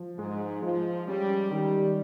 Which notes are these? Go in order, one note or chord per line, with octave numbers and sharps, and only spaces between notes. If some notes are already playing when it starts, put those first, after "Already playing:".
Already playing: F3
G#2 G#3
F3 G#3
G3 C#4
D#3 G3